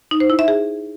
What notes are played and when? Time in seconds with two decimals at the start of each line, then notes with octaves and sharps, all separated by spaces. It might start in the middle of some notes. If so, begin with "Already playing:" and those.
0.11 D#4
0.20 C5
0.30 E4
0.39 E5
0.48 G#4